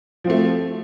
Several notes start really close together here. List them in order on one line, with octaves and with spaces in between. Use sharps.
F3 C4 A3